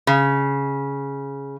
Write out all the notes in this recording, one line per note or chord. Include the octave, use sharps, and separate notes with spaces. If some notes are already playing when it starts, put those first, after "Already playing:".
C#3